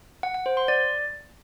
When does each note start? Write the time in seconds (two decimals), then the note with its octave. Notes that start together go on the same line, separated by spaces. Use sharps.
0.23 F#5
0.34 F#5
0.46 C5
0.57 C6
0.68 D5